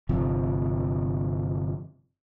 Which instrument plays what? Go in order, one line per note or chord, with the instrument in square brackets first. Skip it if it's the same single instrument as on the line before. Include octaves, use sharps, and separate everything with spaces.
[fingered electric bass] G1 C3 F3